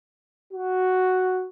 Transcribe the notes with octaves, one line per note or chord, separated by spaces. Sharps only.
F#4